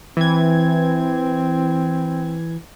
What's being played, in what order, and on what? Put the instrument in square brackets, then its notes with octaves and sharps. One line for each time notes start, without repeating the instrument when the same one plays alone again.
[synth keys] E3 G#6 [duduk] C4